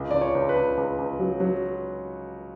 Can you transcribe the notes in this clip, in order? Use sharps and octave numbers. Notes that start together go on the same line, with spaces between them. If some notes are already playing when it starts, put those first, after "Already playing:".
Already playing: C#2
C#2 D5
C#5
C#2
B4
C#2
C#2
C#2
F#3
F#3